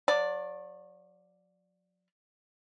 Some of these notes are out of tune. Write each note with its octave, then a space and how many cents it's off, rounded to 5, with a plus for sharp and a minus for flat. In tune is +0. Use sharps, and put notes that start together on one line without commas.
F#3 -40 D5 +0